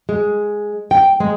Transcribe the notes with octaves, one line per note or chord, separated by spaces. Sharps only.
G#3
G5
G#3